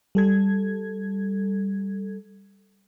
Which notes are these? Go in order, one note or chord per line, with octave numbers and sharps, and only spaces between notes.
G3 A4 G#6